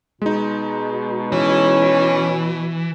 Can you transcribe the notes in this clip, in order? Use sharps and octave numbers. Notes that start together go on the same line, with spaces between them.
B2 G#3 D#4
E3 C#4